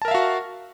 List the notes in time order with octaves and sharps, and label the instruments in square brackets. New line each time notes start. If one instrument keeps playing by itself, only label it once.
[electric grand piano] A5
A#4
E5
F5
F#4